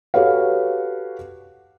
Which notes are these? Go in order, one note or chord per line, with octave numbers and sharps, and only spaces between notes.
F#4 G4 A4 B4 C#5 F5